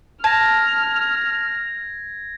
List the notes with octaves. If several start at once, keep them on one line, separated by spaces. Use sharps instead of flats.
A5 F6 G#6 A#6